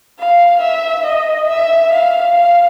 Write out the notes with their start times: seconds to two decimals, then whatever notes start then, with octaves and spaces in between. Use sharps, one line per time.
0.19 F5
0.62 E5
1.06 D#5
1.49 E5
1.93 F5
2.36 F5